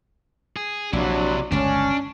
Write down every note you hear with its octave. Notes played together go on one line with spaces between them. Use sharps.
G#4
A#1 C3 F#3 D4 E4
G1 C#2 C#4 D4